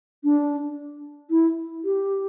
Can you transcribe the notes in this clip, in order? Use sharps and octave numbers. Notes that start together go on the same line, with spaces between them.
D4
E4
G4